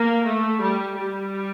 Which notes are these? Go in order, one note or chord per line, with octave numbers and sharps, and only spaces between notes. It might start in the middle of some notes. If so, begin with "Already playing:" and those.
Already playing: A#3
A3
G3
G3